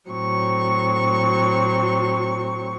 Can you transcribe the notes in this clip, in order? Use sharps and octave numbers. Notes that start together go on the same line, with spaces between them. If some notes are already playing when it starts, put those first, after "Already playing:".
A2 F#3 C4 C#6